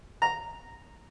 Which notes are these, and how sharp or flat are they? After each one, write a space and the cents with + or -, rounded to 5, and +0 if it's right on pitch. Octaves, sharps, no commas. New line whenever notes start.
A#5 -10